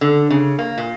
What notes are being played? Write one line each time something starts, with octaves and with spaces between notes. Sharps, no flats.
D3
C#3
A#3
A#2